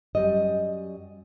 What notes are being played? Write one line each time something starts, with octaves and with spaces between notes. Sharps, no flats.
F#2 G3 D#5